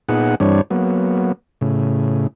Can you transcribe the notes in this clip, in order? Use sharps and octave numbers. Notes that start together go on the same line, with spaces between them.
A#2 B3 D#4 G#4 F#5
G2 E3 G3 C4 D4 C#5
F#3 A#3 B3
A2 C#3